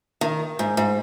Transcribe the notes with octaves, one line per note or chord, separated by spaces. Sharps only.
D#3
G#2
G#2